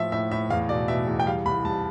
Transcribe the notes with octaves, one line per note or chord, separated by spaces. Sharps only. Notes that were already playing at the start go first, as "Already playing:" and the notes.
Already playing: A2 F3 E5
A2 E5
A2 E5
E2 F5
B2 D5
B2 E5
E2
G5
G3 F5
C2 B5
C2 A5